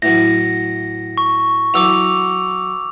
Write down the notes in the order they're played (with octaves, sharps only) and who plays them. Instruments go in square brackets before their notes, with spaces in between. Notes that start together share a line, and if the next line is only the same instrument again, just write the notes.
[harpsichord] A2 E3 F#3 [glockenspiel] A#6
[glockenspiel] C#6
[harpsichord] E3 F#3 A4 [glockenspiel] D6 E6 F7